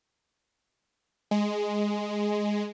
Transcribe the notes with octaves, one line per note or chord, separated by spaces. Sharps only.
G#3